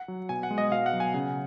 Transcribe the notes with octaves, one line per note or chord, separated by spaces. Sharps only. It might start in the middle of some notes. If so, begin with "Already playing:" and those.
Already playing: F#5
F#3
B2 G#5
F#5
G#3
D#5
B2 F5
F#5
F#3
G#5
C#3 F#5